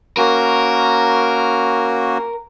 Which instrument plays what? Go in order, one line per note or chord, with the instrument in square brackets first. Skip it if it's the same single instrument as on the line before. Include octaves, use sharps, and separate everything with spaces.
[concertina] A#3 C#4 F#4 [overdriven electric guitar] A#4